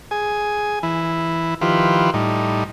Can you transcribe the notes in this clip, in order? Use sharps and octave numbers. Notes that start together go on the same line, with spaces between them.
G#4 G#5
E3 E4
D#3 F3 E4 F4 G4 B4
A2 G3 D#4